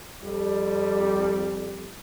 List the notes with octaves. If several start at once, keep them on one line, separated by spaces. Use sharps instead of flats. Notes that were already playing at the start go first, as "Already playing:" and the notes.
F2 G3